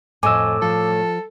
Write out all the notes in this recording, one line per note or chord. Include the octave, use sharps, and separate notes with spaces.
F2 A2 D#5 G#5 D6 E6
F3 A4